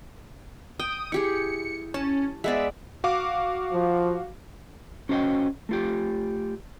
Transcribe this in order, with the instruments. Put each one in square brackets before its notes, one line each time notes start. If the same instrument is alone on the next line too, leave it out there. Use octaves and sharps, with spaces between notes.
[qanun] G5 [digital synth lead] D#6
[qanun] E4 G4 G#4 [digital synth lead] C#7
[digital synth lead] C#4 [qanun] A5
[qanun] G#3 B3 D5 [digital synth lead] E5
[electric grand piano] F#4 F5 D6
[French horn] F3
[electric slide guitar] C#4 F#4 C5 D5 D#5 G5
A3 F4 G4